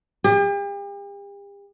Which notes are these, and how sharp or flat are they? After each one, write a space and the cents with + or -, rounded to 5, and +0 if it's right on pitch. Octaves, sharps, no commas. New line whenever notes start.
G4 +40